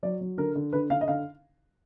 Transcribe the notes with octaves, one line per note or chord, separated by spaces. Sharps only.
F#3 D5
F#3
D3 A#4
D3
D3 B4
D3 F5
D#5
D3 F5